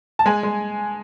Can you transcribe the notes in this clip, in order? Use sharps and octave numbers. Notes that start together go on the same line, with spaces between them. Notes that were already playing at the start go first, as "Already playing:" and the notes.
A5
G#3 G#5
G#3